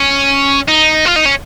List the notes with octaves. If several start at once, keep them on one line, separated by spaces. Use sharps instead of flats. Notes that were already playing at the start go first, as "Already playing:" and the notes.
Already playing: C#4
D#4
F4
D#4
C#4